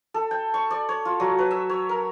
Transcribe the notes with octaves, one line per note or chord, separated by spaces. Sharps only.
A4
G5
C#6
D5
C#5
F4
F#3
B4
E5
C#5
A#4